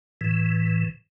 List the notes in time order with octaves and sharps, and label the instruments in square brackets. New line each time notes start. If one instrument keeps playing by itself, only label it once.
[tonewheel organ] A2 E3